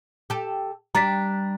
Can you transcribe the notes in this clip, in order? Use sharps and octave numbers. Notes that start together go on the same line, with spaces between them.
G4 A4
G3 D4 A#5 A6 B6